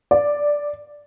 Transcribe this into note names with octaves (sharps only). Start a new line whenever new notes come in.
D5